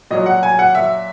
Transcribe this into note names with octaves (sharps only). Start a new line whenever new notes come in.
A#2 F#3 D#5
F#5
G#5
F#5
E5